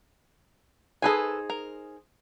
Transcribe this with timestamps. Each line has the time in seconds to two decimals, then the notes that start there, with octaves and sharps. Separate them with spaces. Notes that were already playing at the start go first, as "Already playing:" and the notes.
1.02 D#4 G#4 A4 B4 C5 G#5
1.50 A#4